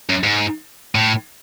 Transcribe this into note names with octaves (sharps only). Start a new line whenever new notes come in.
F#2
G#2
A2